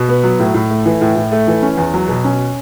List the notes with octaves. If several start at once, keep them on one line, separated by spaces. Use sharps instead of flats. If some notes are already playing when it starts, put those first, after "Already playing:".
Already playing: B2
B3
F#3
A2
A2
A3
E3
A2
A2
A3
E3
C#4
E2
F#3
B2
C#4